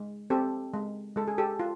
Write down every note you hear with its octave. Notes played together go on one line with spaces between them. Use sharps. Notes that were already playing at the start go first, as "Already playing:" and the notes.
Already playing: G#3
C4 G4 A4
G#3
G#3 A4
G#4
G4 A4
F4